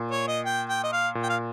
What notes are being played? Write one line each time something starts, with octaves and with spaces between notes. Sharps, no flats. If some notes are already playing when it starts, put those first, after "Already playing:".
Already playing: A#2
C#5
D#5
G5
G5
D#5
F5
A#2
G5
F5